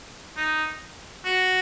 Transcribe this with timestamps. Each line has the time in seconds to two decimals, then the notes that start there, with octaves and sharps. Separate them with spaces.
0.37 D#4
1.25 F#4